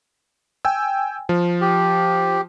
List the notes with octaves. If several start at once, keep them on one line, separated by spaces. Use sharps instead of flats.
G5 G#5 E6
F3
G4